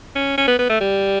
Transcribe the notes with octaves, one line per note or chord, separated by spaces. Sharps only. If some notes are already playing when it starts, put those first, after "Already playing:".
C#4
C#4
B3
B3
A3
G3